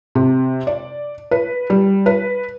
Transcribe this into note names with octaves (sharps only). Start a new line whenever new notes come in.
C3
D5
B4
G3
B4